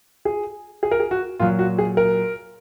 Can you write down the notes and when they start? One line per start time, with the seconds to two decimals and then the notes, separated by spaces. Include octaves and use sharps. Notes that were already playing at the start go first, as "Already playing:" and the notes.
0.25 G#4
0.83 G#4
0.91 A#4
1.00 G#4
1.11 F#4
1.40 A#2 F#3 F4
1.59 F#4
1.78 G#4
1.97 A#4